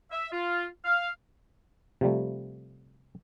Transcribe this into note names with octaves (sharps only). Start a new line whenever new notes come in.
E5
F4
F5
C3 F3 G3 A3